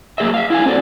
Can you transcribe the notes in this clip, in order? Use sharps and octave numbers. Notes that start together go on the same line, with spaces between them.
F#3 A#3 B3 G#4 D#5 E5
E5 F5
E4 F5 G#5
C4 F#4 A4 D5